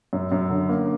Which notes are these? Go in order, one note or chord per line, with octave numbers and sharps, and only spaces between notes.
F#2
F#2
D3
A#3